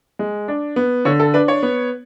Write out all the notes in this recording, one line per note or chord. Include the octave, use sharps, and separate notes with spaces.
G#3
D4
B3
D3 C#5
A4
D4 B4
C#5
B3